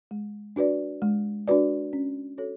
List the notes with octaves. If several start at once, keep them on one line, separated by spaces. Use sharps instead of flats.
G#3
D4 F#4 B4 D5
G#3
D4 F#4 B4 D5
C#4
F#4 A4 C#5